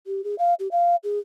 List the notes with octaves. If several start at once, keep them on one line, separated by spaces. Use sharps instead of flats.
G4
G#4
F5
G4
F5
G#4